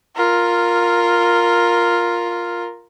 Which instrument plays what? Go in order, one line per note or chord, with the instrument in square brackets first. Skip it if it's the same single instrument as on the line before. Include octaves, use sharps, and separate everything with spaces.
[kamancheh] F4 A#4